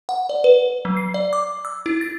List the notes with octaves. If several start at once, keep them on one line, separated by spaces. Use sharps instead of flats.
F#5
D5
B4
F#3
C7
D5
D6
E6
E4
A6